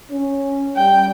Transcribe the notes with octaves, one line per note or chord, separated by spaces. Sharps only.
C#4
G3 G5